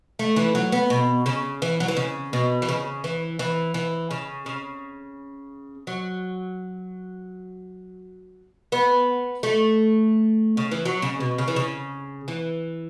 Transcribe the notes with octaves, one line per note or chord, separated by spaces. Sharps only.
A3
E3
F#3
B3
B2
C#3
E3
F#3
E3
C#3
B2
E3
C#3
E3
E3
E3
C#3
C#3
F#3
B3
A3
C#3
E3
F#3
C#3
B2
C#3
E3
C#3
E3